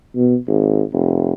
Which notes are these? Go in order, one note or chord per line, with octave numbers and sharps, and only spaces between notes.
B2
G#1
F1